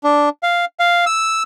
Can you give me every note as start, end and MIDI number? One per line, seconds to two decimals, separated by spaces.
0.04 0.29 62
0.43 0.65 77
0.79 1.05 77
1.06 1.43 88